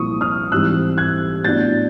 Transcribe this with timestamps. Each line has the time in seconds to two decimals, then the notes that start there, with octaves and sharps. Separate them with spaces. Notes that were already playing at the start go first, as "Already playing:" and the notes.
Already playing: C2 A#2 F3 C#6 D#6
0.21 D#6 F6
0.52 G#2 E3 G3 C4 E6 F#6
0.98 F#6 G#6
1.44 A2 F#3 B3 D4 G6 A6